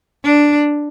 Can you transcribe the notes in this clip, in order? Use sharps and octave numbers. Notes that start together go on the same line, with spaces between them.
D4